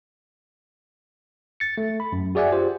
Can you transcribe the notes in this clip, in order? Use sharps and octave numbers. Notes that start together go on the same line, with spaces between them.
A6 C#7
A3
B5
F#2
F#4 G#4 D5 E5 F#5 G#5
F4 G4 C5